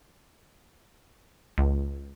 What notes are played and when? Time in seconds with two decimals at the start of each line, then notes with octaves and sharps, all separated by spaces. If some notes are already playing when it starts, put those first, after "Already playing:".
1.58 C#2